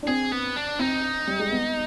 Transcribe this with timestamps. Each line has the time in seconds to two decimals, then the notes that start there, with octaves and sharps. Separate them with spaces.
0.03 D4
0.07 C4 G#4
0.32 B3
0.56 D4
0.79 C4 D#4
1.27 G3
1.39 G#3
1.52 B3